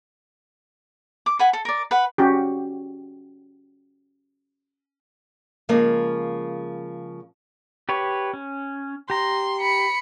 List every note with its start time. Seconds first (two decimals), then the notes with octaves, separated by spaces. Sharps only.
1.26 D6
1.39 B4 F#5 G#5
1.53 A4
1.65 A#4 D5
1.91 B4 F#5
2.18 C#4 F#4 G4
5.69 C#3 F3 G#3 A#3 A#4
7.89 G4 B4 C#5
8.34 C#4
9.10 G4 A#5 C6
9.61 B5 C#7